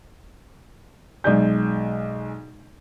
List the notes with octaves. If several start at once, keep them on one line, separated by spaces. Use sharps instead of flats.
B1 G#3 D5 G6